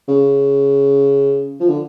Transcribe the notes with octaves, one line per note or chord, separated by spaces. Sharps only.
C#3
F3
D3